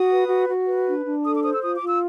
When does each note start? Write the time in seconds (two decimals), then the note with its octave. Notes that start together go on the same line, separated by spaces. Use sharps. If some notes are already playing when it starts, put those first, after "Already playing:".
Already playing: F#4 D#6
0.11 B4
0.30 F#4
0.48 F#4
0.68 B4
0.87 D4
1.06 D4
1.25 A4 D#6
1.34 D6
1.43 C5 D#6
1.53 E6
1.62 F4 D#6
1.76 D6
1.82 F4
1.88 E6